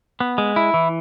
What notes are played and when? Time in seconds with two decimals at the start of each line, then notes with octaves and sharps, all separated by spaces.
0.20 B3
0.38 G#3
0.56 E4
0.74 E3